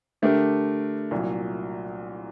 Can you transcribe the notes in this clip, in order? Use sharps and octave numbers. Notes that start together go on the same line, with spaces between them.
D3 A3 D4 G4 A#4
C2 A#2 F#3